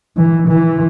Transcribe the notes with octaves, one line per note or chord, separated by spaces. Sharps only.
E3
E3